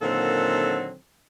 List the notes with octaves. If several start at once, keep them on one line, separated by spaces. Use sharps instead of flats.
A#2 D3 D#3 F#3 C4 A4